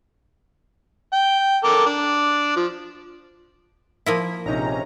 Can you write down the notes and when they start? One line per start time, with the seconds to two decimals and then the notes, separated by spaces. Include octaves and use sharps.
1.13 G5
1.64 A4 A#4 D6
1.86 D4
2.56 F3
4.06 F3 A#3 E4
4.46 A#1 C3 C#4 D#4 A#5